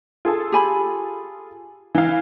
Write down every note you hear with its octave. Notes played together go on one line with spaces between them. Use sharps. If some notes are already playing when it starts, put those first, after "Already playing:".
F4 G#4 A4
G4 G#5 B5
E3 F5